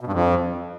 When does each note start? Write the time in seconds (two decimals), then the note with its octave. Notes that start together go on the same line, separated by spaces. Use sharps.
0.01 B2
0.07 G2
0.13 F2